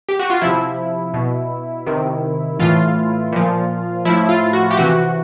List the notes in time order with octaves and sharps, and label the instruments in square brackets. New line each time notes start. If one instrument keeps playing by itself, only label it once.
[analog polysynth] G4
F#4
F4
C3 F3 E4
B2
C3 D#3
A2 E3 F4
A#2 F3
A2 F3 E4
F4
F#4
G4
C3 E3 F#4